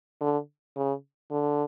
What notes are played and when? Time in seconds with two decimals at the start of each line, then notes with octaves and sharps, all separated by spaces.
0.21 D3
0.76 C#3
1.31 D3